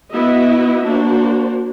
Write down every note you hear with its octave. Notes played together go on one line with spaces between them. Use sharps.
B3 E4 F#4 D#5 E5
A#3 D4 F#4 C5